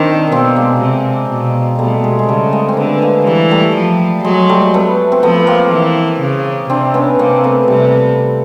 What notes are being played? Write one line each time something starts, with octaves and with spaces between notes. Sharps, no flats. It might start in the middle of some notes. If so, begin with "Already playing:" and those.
Already playing: D#3 C4 D4
B2 A#3 C4
G#3 A#3
C3
B2
B2 G3 A3
G#3
G#3
C#3 G3 A3
G#3 A#3
C4
D3 A3 B3
G#3 A#3
E3 G3 A3
G3 A3
F3
F#3 G#3
G3 A3
A3 B3
C4
F3 A3 B3
A#3 C4
E3
C#3
C3 C4 D4
B3 C#4
C3 A#3 C4
A3 B3
C3 G3